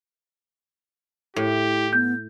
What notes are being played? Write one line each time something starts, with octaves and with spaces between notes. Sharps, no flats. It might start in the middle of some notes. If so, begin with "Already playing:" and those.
A2 E4 G4
B3 G6